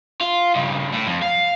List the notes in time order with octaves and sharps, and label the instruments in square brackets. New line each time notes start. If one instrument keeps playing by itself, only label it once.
[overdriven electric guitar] F4
G2 C#3
A2
F2
F5